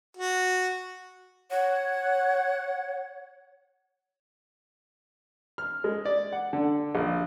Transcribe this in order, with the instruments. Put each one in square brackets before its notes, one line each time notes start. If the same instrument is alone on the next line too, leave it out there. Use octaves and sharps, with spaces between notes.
[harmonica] F#4
[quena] C#5 [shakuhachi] F#5
[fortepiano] F6
G#3
D5
F#5
D3
A#1